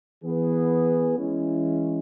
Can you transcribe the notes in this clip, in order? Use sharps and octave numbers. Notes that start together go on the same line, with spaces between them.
E3 B3 G#4 B4
E3 G#3 C#4 E4